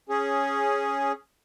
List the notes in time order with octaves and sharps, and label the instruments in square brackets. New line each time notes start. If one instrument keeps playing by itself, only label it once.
[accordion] C#4 G#4